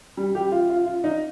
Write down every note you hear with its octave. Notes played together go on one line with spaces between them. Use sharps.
G3
G4
F4
F4
F4
D#4